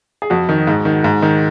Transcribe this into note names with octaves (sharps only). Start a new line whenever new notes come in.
G#4
F2 F#4
D#3
G#2
D#3
G#2
D#3